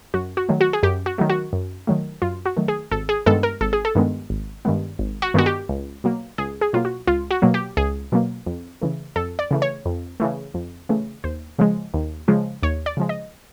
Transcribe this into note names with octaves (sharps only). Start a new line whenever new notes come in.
F#2 F#4
F#4
D#3 F#3 A3
F#4
G#4
F#2 G4
F#4
D#3 F#3 A3
F#4
F#2
D#3 F#3 A3
F#2 F4
F#4
D#3 F#3 A3
G#4
G#1 A4
G#4
G2 D#3 G#3 B3 A4
A#4
G#1 A4
G#4
A4
G2 D#3 G#3 B3
G#1
G2 D#3 G#3 B3
G#1
F#4
G2 D#3 G#3 B3 F#4
G4
C#2
B2 F#3 A#3
C#2 G#4
G#4
B2 F#3 A#3 F4
F#4
C#2 F4
F#4
B2 F#3 A#3
G4
C#2 G#4
B2 F#3 A#3
F2
C#3 E3 A3
F2 A4
D5
C#3 E3 A3
C#5
F2
C#3 E3 A3
F2
C#3 E3 A3
D#2 C5
C#3 F3 G#3
D#2
C#3 F3 G#3
D#2 C#5
D5
C#3 F3 G#3
D#5